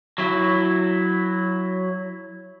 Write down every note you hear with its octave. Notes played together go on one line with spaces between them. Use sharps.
F#3 E4